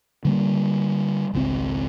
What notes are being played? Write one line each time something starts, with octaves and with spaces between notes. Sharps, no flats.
D3 G3 A#3
G#1 C#2 D3 C4